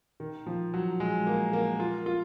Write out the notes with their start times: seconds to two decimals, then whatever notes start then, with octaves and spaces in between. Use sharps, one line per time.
0.20 D#3
0.46 F3
0.74 F#3
1.00 G#3
1.27 A#3
1.53 A#3
1.80 F4
2.06 F4